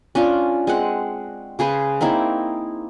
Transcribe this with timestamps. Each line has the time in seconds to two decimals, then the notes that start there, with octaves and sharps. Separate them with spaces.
0.15 C#4 D4 F4
0.67 G#3 C4 F#5
1.59 C#3 G#4 B4 C5
2.01 A#3 C4 D#4 E4